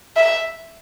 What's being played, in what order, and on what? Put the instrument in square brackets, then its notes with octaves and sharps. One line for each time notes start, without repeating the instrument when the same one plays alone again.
[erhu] E5